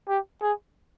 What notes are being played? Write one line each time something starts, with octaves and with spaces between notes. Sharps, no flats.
G4
G#4